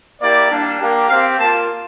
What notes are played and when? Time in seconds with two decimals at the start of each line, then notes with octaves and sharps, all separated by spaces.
0.20 A#3 E4 G4 D5
0.50 G3 A#3 D4
0.80 A#3 D4 G4
1.08 C4 G4 F5
1.38 A#3 F4 A5